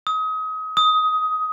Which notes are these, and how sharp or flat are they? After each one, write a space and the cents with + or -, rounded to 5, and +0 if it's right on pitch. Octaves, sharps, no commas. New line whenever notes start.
D#6 +30
D#6 +15